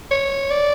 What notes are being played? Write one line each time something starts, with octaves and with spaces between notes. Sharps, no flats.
C#5
D5